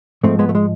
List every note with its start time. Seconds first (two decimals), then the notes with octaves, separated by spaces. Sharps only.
0.23 G#2 F3 G#3 A3 C4
0.39 G#3 B3
0.49 A3
0.55 G#3